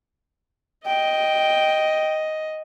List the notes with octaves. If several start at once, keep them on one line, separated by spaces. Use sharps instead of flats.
D#5 G5